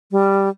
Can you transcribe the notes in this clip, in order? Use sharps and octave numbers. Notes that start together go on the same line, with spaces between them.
G3